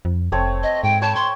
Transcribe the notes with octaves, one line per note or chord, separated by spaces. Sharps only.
F2
F1 A3 C4 C#5
D#5
G#2 G5
C#5 G5 A5 B5
C6 C#6